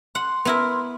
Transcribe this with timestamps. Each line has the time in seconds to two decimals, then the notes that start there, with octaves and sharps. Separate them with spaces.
0.15 F#5 C6
0.45 B3 E4 A#4